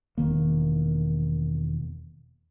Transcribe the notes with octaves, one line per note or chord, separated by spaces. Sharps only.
E1 D#3 A#3